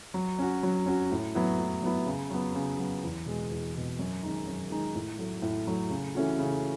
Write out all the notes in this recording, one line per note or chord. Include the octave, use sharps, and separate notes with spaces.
F#3
C#4 F#4
F#3
C#4 F#4
A2
F#3 B3 E4
A2
F#3 B3 E4
C#3
F#3 B3
C#3
F#3 B3
E2
B2 G#3
E2
B2 G#3
F#2
D#3 G#3 D#4
F#2
D#3 G#3 D#4
A2
F#3 A3
A2
F#3 A3
C#3
E3 A3 C#4 F#4
C#3